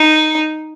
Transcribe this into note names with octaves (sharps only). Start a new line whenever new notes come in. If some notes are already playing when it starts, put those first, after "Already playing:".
Already playing: D#4